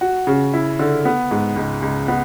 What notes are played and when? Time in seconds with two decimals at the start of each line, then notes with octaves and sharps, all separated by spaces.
0.01 F#4
0.27 C#3
0.54 E4
0.79 D3
1.05 B3
1.31 G#2
1.56 C#2
1.82 C#2
2.08 B3